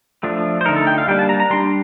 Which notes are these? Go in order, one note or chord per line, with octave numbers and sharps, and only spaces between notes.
F3 A3 D4
C5
D3 A3 D#4 A#4
A4
G5
F5
G3 A#3 D4 G5
A5
A#5
A#5
G3 D4 C6